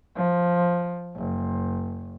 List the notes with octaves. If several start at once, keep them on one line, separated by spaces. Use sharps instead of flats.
F3
F#1